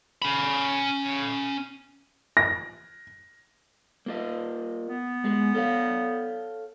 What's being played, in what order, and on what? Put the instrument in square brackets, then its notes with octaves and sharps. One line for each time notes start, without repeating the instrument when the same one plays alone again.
[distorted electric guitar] C#4 B5
[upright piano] A#6
[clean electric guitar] A#3 F4 D#5
[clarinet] B3
[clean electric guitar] G#3 G#4
A4 C#5 F5